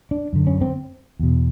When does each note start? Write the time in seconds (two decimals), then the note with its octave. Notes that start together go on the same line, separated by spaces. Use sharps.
0.11 D4
0.33 F#2 D3
0.47 C#4
0.61 C4
1.19 E2 B2